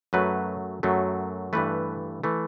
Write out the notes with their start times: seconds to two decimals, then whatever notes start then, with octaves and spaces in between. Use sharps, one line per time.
0.13 F#2 F#3 A3 B4
0.83 F#2 F#3 A3
1.53 G2 E3 A3 B4
2.24 E3 A3